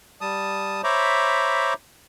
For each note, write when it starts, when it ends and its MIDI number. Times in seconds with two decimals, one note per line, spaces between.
0.21 0.82 55
0.21 0.82 81
0.21 0.82 87
0.84 1.74 72
0.84 1.74 73
0.84 1.74 76
0.84 1.74 82
0.84 1.74 83
0.84 1.74 86